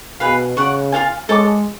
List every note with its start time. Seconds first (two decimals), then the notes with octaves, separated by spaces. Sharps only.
0.20 B2 G#4 B4 F5
0.56 C#3 D5 F#5 C#6
0.92 F4 A4 F5 G#5
1.29 G#3 A4 C#5 G#5 D6